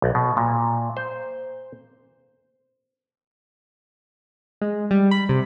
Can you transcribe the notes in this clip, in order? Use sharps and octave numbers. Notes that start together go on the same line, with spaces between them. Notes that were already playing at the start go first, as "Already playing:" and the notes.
B1
B2
A#2
C5
G#3
G3
B5
C3